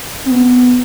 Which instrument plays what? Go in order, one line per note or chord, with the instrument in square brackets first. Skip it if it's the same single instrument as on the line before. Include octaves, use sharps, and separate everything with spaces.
[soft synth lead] C4
B3